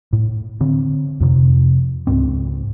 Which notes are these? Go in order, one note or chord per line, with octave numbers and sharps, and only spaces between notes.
A2
D3 C4
F2 C3
C#2 G#2 C4